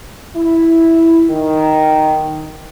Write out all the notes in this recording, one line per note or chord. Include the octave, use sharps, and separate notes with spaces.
E4
D#3